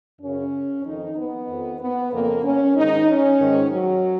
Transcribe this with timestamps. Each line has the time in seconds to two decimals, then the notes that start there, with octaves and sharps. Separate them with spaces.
0.21 F#2 C#3 C#4
0.85 F2 D#3 D#4
1.16 B3
1.48 F2 D#3
1.80 B3
2.12 F2 C#3 A#3
2.44 C#4
2.75 G#2 D#3 D#4
3.07 C#4
3.38 G#2 D#3
3.71 F#3